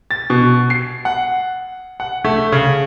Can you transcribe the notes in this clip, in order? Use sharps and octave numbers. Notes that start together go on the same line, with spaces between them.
A6
B2
C7
F#5
F#5
A3
C#3